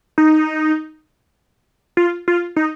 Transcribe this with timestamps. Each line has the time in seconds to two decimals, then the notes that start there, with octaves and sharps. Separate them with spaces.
0.18 D#4
1.97 F4
2.28 F4
2.56 D#4